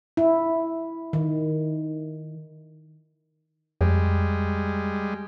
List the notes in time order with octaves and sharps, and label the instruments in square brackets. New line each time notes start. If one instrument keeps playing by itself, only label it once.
[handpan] E4
D#3
[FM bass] F2 [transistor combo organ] G3 G#3